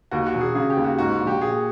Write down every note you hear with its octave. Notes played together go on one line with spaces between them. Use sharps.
D#2 F#4
F#4
E1
G#4
C#3 G#4
G4
D#2
F#4
G#2 F#4
A#1
G4
A#2 G#4